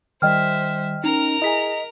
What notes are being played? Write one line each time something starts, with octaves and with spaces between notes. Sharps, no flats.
D#3 G3 C5 D#5 E5 G5 F6
C#4 D#4 A#4 A#5
E4 G#4 D#5 G#5 B6